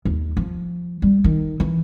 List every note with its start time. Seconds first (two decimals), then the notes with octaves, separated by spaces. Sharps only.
0.05 D#2
0.37 F3
1.02 G3
1.24 D#3
1.60 E3